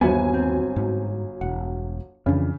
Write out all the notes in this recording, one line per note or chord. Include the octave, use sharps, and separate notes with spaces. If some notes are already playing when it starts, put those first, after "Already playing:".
G1 D#2 F#3 B3 C5 E5 G#5
C4
G#2
E1 F#5
F2 C#3 E3 D4